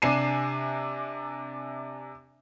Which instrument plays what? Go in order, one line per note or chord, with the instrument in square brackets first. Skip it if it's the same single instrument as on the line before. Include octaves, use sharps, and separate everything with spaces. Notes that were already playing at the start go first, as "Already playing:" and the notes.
[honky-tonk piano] C3 D4 G#5 C7 D#7 E7